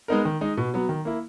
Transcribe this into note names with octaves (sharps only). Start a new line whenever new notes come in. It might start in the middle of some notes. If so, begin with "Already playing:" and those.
G#3 B3 D#4 A#4
D#3
G#3 D#4
B2
F#3 B3
D#3
A#3 E4